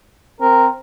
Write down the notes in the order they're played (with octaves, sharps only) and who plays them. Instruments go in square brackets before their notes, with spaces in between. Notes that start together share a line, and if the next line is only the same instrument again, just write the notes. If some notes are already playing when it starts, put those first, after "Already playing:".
[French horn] C4 [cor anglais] A#4